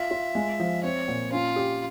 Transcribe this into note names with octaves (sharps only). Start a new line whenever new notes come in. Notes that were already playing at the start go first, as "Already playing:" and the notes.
Already playing: F4 E5
F4
G#3
F3
C4 C#5
A#2
C#4 F4
G4